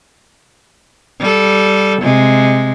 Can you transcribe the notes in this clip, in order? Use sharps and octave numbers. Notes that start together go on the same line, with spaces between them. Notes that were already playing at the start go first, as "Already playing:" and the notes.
G3 A4
C3 G#3